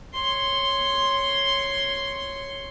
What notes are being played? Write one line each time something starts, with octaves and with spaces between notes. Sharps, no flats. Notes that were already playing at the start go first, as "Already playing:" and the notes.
C#5 C6